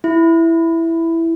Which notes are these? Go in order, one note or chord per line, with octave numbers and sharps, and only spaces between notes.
E4